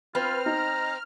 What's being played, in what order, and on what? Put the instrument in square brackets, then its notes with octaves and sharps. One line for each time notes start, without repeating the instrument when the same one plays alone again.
[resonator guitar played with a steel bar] C4 [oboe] F4 [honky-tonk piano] B4 [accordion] F6
[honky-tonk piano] D#4 [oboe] A#5